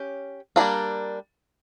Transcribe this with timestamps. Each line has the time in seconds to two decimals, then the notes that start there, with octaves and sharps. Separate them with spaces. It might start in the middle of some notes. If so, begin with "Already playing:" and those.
Already playing: C#4 G4
0.56 G3 A#3 D4 F4 A#4